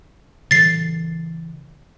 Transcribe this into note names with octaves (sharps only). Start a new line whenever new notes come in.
C#3 E3 A6 C7